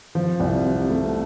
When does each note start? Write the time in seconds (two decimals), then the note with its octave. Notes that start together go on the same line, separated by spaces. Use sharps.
0.15 F3
0.40 C2
0.65 C3
0.90 A3